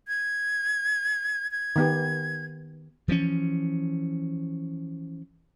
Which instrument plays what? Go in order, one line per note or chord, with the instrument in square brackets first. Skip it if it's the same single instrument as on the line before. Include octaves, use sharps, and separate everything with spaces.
[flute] G#6
G#6
[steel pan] D#3 B3 G4
[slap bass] E3 F3 G#3 C#4